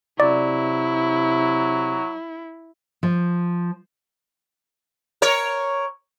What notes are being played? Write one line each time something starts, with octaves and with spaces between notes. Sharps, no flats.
C3 F#3 E4 D5
F3
A#4 C#5